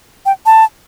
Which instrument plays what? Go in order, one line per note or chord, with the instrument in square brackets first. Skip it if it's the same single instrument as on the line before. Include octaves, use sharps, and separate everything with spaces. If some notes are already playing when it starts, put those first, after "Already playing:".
[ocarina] G5
A5